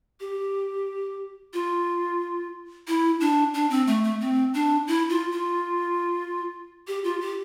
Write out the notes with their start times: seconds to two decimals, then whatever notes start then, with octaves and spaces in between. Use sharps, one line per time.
0.20 G4
1.54 F4
2.87 E4
3.20 D4
3.54 D4
3.70 C4
3.87 A3
4.04 A3
4.21 C4
4.54 D4
4.87 E4
5.09 F4
5.32 F4
6.88 G4
7.04 F4
7.21 G4